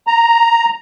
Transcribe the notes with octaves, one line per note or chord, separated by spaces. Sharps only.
A#5